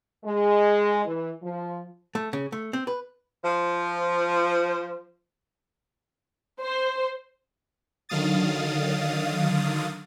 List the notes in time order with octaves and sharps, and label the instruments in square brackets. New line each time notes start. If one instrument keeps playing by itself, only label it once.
[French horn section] G#3
E3
F3
[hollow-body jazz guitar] A3
C#3
A3
C4
B4
[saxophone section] F3 C5
[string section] C5
[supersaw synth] D3 D#3 F#3 F5 D#6 A6